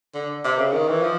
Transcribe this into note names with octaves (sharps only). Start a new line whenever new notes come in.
D3
C3
C#3
D#3
E3
F3